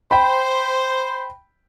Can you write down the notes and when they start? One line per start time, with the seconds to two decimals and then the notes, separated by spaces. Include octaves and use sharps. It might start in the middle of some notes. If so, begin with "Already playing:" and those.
0.11 C5 G5 B5